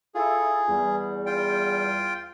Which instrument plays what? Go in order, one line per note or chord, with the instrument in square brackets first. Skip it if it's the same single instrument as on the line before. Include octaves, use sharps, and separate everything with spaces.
[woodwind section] E4 F4 A4 [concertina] G#4
[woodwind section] E2 G3
[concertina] F4 G5